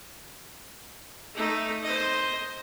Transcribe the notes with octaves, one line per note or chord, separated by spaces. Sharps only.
A3 D#4
C5 D#5